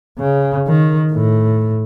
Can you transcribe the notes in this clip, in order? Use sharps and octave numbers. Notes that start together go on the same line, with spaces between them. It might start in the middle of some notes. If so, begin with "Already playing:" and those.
C#3
D#3
A2